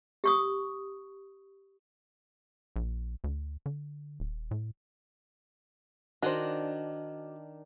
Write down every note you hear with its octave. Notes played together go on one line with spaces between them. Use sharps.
G4 C#6 D#6
A#1
D2
D3
D#1
A2
D#3 D4 F#4 C5